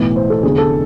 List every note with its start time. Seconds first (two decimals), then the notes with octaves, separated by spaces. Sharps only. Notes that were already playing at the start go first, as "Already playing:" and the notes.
Already playing: B1 A2 E3
0.16 C5
0.30 A4
0.43 F1 E2 D3 G#4
0.58 A4